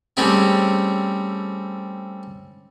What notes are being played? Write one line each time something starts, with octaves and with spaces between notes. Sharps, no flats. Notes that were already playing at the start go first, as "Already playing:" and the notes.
G3 A3 C4 C#4 E4 G#4